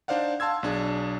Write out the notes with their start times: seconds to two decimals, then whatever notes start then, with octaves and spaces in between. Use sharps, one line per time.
0.08 D4 D#4 C5 D5 F5 F#5
0.40 F5 A5 C6 E6 G#6
0.63 B1 D4 G#4